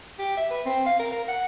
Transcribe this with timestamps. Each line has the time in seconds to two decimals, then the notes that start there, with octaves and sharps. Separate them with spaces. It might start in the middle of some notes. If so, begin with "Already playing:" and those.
0.19 G4
0.37 E5
0.51 B4
0.66 C4
0.86 F5
0.99 A#4
1.12 A#4
1.28 F#5